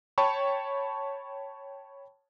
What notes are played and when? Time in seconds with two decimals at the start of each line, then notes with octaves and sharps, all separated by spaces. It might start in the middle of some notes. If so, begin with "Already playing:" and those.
0.18 C#5 G5 A5 B5 C#6